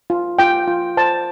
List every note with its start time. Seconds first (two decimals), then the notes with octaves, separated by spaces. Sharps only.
0.10 F4
0.39 F4 G5
0.67 F4
0.97 C5 A5